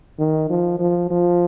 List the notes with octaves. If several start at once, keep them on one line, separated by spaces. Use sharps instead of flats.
D#3
F3
F3
F3